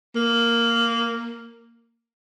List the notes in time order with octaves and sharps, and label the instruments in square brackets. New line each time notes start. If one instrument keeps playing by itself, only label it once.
[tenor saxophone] A#3